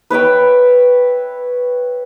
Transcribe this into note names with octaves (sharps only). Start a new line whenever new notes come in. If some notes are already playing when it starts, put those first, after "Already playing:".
B4 C#5 E5 G5